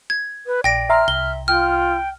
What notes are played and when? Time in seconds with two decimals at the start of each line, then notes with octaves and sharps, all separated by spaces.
0.10 G#6
0.47 B4
0.64 A#1 D5 G5 A#6 D7
0.89 E5 A#5 C6 F6
1.08 C2 E5 G7
1.48 F4 G5 F6